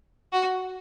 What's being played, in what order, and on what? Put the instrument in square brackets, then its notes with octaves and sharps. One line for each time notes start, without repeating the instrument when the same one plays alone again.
[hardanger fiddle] F#4